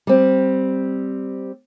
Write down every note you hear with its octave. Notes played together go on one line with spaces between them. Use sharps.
G3 C4